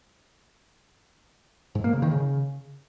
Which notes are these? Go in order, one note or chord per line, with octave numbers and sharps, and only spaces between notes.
G#2
A#3
C#3
D#3
C#3